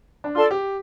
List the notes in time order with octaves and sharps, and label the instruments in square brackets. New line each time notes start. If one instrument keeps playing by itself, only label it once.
[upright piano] D4
[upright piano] F4 [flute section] A4 D5 A5 C6
[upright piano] G4